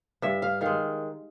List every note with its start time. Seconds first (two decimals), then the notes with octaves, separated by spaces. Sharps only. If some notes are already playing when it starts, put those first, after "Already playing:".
0.22 G2 E5
0.42 F5
0.61 D#3 G#3 F5